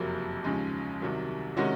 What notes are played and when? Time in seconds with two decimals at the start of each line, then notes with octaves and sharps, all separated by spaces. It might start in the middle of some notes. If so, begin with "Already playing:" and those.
Already playing: F#1 F2 C3 F#3 A#3
0.44 D#2 C#3 F3 G#3
1.01 C2 C3 D#3 F#3
1.57 C3 D#3 G#3 C#4 F#4